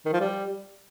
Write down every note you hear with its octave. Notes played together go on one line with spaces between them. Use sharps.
D#3
F3
G3